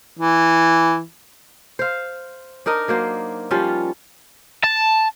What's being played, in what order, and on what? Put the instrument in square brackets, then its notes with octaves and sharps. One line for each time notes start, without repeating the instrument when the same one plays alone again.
[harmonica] E3
[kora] C5 F5
D4 D#4 A#4 D#5
F#3 A#3 C5
F3 G3 C#4 F4
[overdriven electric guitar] A5